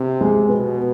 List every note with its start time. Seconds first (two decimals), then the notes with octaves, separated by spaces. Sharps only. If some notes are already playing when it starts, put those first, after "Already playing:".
Already playing: C3
0.21 G#3
0.49 B2 B3